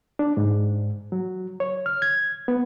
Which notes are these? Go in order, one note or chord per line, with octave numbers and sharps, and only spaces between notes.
D4
G#2
F#3
C#5
F6
G#6
B3